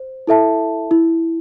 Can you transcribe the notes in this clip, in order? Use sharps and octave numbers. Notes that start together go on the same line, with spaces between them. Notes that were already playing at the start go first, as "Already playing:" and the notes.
Already playing: C5
E4 A4 E5 A5
E4